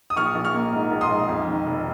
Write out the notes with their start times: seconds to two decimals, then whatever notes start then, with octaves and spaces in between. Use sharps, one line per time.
0.10 D#6
0.16 A#1 C#6 F6
0.35 A#1
0.45 C#6 F6
0.54 A#3
0.72 G#2
0.91 A#1
1.01 C6 D#6
1.11 G#2
1.28 F2
1.47 D#3
1.66 F1